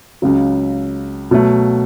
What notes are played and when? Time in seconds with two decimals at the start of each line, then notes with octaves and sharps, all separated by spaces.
0.22 C#2 C#3 F#3
1.31 B2 F#3 A3